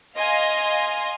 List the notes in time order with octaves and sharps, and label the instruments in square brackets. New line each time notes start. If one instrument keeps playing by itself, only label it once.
[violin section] D#5 F5 G#5 C6